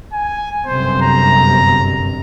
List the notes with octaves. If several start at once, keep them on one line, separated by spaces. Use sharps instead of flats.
G#5
G1 F#2 C3 C5
A#5